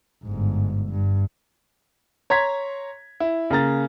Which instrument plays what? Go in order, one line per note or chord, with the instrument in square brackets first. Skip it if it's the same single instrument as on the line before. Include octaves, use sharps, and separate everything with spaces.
[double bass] G1 G#2
G2
[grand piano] C#5 A#5 C6 G#6 B6
E4
C#3 A#3 A#5 A6